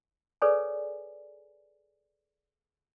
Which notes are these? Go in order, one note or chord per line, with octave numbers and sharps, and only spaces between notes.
G#4 A4 B4 C#5 D5 G#5